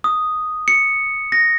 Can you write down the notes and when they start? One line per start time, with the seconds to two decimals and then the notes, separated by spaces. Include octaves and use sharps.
0.04 D#6
0.68 C#7
1.32 A#6